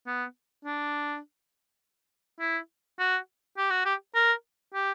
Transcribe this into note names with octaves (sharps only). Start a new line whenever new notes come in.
B3
D4
E4
F#4
G4
F#4
G4
A#4
G4